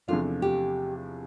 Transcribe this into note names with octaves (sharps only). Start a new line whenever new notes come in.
E2 C3 F3 A3 D4 F4
G4